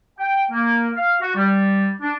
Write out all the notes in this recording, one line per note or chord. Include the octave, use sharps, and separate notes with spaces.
G5
A#3
F5
F#4
G3
D4